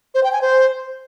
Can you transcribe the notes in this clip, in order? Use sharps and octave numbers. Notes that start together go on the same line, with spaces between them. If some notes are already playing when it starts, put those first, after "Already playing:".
C5
G5
G#5
C5